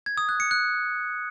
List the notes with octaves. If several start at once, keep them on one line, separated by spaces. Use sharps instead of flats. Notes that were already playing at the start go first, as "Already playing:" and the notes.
G#6
D#6
F#6
C#7
F#6